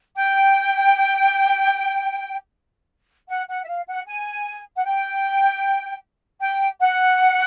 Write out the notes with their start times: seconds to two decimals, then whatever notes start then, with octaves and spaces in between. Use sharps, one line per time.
0.17 G5
3.29 F#5
3.48 F#5
3.64 E5
3.68 F5
3.87 F#5
4.07 G#5
4.76 F#5
4.85 G5
6.40 G5
6.80 F#5